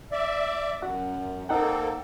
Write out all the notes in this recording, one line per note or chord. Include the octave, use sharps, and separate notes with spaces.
D5 E5
F#2 F#4 F#5
A#3 C4 D#4 A4 F#5 G5